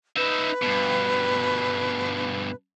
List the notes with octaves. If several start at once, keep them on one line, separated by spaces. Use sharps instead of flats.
D#4 B4 E5
G2 B2